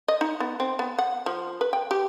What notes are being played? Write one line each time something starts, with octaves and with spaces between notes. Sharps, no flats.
D#5
D#4
B3
C4
B3
F#5
F3
B4
G5
G4